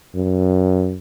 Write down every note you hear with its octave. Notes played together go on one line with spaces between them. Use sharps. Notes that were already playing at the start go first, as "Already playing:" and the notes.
F#2